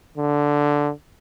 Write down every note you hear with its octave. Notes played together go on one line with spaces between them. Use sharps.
D3